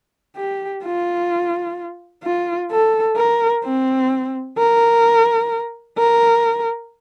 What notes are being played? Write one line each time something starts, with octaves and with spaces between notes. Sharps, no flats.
G4
F4
F4
A4
A#4
C4
A#4
A#4